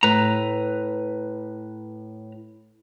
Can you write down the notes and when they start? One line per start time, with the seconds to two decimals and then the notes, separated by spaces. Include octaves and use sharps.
0.03 A2 B4 A#5